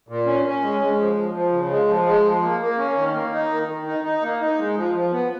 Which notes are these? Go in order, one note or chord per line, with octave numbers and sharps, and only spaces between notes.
A#2
C#4
C#4
G#3
G#3
F3
F3
F3
C#3
G#3
F3
G#3
F3
A#3
A#3
C#4
D#3
A#3
D#4
D#3
D#3
D#4
D#4
A#3
D#4
G#3
F3
F3
B3